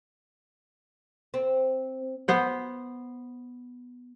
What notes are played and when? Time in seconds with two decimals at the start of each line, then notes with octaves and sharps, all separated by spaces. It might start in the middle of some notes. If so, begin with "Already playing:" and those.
1.34 C4
2.28 B3 C5 F#5